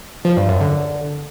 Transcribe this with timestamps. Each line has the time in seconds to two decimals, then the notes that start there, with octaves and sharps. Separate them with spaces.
0.25 F3
0.37 G2
0.49 F#2
0.61 D3